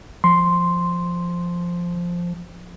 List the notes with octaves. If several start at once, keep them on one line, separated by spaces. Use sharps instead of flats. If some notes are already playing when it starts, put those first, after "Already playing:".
F3 C6